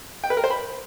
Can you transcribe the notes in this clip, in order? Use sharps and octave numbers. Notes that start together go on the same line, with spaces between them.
G5
B4
A#4
C5
B5